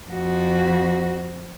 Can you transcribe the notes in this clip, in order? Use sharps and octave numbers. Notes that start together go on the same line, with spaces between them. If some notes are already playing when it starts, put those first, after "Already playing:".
F2 F#4